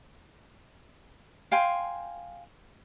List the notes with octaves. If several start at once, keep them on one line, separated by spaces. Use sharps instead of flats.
F5 G5 G#5 C6